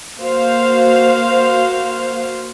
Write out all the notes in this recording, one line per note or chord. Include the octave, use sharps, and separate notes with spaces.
A#3 F#4 C5 F5